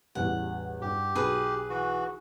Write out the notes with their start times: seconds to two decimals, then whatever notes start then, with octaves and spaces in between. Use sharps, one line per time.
0.15 A1 E2 G3 F#5
0.82 G2 G4
1.15 B1 G#4 B4
1.70 E3 F#4